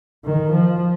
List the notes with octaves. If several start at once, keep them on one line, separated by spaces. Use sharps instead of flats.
D#3
F3